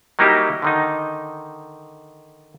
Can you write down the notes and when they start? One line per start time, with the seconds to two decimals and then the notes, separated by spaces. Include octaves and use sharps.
0.19 F#3 G3 A#3 D#4 E4 G4
0.62 D3 D#3 D#4